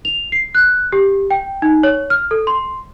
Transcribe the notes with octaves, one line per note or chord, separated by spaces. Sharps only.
F7
C7
F#6
G4
G5
D#4
C#5
F6
A4
C6